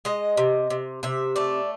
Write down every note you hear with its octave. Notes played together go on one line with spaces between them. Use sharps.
G#3 D#5
C3
C3
C3 E5
A3 D5